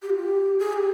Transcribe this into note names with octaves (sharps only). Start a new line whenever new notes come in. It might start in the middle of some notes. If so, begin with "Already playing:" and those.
G4
F4
G4
G#4
G4